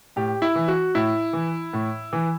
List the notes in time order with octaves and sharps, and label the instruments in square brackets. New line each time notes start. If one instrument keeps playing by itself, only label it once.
[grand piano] A2 G4
E4
E3
F#4
A2 E4
E3
A2
E3